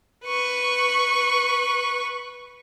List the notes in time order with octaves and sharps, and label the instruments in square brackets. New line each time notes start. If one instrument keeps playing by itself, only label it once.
[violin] B4 C#6